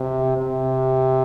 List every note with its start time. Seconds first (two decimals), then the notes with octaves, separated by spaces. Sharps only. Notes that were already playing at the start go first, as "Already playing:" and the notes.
Already playing: C3
0.38 C3